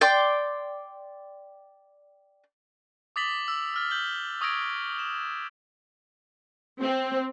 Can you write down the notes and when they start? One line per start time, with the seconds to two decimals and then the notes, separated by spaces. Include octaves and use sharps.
0.01 D5 G5 C6 D6
3.16 D6 D#6 A6 B6 F#7 G7
3.48 E6
3.74 E6 F6 A6
3.91 G6 F#7 G7
4.41 C#6 D#6 E6 G#6 A#6 D7
4.99 E7
6.81 C4